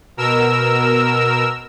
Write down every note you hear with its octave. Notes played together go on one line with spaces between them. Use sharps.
B2 A#4 E6